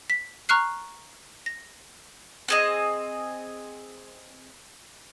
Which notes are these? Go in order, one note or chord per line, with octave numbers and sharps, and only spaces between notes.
B6
A#5 C#6 F6 F#6 C7
A#6
C4 G#4 D#5